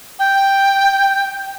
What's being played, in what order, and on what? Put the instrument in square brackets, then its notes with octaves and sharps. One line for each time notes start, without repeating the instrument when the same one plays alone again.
[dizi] G5